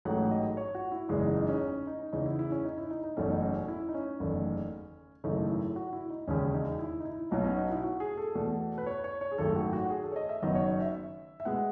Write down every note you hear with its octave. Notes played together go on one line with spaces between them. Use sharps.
A1 G#2 F#3 A3 F#5
D#5
C#5
F#4
E4
F#1 E2 C#3 E3 G#3 D#4
D#4
D#4
C#4
D#4
C#4
D#4
E2 C#3 E3 D#4
E4
E4
C#4
D#4
E4
D#4
D#4
F#1 E2 B2 A3 C#4
D#4
C#4
C#4
E4
D#4
C#4
F#1 E2 D#3 A3
G#1 F#2 C#3 E3 A3 D#4
E4
F#4
E4
D#4
E1 D#2 C#3 C#4
D#4
E4
D#4
E4
B1 B2 F#3 B3 D#4
C#4
D#4
E4
F#4
G#4
A4
E2 B2 A3
B4
C#5
C#5
C#5
G#4
G#1 F#2 D#3 A3 A4
F#4
F#4
G#4
A4
C#5
D#5
E5
F#1 F#2 D#3 F#3 B3 D#5
C#5
D#5
E5
E5
B2 G#3 B3 F#5